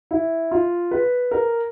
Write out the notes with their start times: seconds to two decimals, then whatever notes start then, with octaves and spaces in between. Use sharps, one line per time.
0.11 E4
0.51 F4
0.91 B4
1.31 A#4